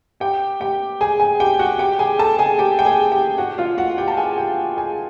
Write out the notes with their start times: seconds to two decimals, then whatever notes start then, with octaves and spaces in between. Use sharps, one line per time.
0.20 G4 G5
0.60 G4 G5
1.01 G#4 G#5
1.20 G#4 G#5
1.40 G4 G5
1.59 F#4 F#5
1.79 G4 G5
1.99 G#4 G#5
2.19 A4 A5
2.38 G#4 G#5
2.59 G4 G5
2.79 G5
2.85 G#4 G#5
3.12 G4 G5
3.38 F#4 F#5
3.58 F4 F5
3.78 F#4 F#5
3.98 G4 G5
4.08 A5
4.17 G#4 G#5
4.37 G4 G5
4.76 G#4 G#5